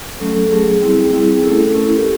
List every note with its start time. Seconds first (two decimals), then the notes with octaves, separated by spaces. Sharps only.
0.20 F#3 A3 C#4 A4
0.35 A4
0.51 F#3 A3 C#4 G#4
0.82 G3 C4 E4
1.13 G3 C4 E4
1.32 G#4
1.43 A3 C#4 E4 A4
1.74 A3 C#4 E4 A#4
1.85 A4
1.96 G4